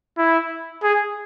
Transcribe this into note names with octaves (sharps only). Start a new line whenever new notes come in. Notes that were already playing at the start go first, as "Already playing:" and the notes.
E4
G#4